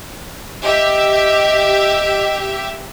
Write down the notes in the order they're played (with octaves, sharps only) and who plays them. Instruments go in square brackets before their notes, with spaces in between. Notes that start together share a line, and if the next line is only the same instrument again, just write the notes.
[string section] G4 E5 [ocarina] D#5